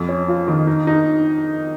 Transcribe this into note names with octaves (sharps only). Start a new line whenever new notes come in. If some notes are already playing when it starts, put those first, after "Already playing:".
Already playing: F2
C#4
F4
D#3
D#4
D#4